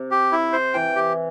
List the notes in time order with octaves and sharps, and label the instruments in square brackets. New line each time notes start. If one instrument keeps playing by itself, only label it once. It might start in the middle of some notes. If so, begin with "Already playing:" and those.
Already playing: [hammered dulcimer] C3
[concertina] G4
E4
C5
[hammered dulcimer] E3 [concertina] G5
[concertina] G4